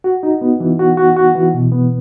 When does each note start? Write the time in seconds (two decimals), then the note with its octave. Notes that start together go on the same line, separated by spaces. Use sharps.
0.04 F#4
0.23 D#4
0.41 B3
0.60 E3
0.79 F#4
0.97 F#4
1.16 F#4
1.35 E3
1.54 B2
1.72 B3